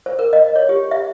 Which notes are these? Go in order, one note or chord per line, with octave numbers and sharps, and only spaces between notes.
C5
A#4
D#5
C#5
G4
E5